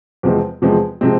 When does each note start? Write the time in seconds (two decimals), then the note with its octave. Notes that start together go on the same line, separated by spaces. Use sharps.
0.23 E2 C3 F3 G#3 C4
0.62 E2 C3 F3 G#3 C4
1.01 C3 F3 G#3 C4